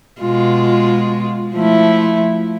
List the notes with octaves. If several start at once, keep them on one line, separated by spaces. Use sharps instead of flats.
B2 G#3 F4
F3 A3 E4